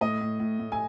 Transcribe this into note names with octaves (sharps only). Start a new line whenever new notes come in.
A2 D#5
A2
A2
A2
G#5